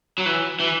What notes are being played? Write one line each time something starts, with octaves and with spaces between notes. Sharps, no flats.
F#3
E3
E3